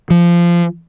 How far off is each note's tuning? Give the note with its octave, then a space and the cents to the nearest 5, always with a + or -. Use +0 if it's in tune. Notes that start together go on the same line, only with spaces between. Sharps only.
F3 -20